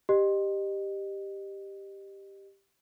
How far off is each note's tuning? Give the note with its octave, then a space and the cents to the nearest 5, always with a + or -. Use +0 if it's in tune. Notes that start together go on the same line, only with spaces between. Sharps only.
G4 +0 D#5 -25